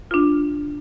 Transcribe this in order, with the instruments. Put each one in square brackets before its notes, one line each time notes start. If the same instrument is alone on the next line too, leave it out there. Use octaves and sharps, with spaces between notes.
[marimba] D4 F4